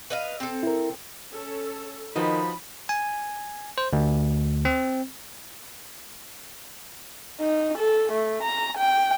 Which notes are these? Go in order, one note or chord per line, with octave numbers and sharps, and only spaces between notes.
B4 D#5 F5
C4 A4
E4 A#4
C#4 A4
D#3 F3 D#4 F#4 B4 D#5 B5
G#5
C5
D2
C4
D#4
A4
A3
A#5
G5